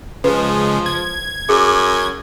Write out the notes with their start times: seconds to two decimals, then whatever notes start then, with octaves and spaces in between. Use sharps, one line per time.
0.24 C#3 F3 G#3 B4
0.86 G#6
1.49 F#2 G#4